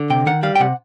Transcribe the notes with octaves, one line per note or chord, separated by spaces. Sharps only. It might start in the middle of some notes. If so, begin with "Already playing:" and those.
Already playing: D3
C3 G5
D#3 F#5
G3 F5
G5
C3 F#5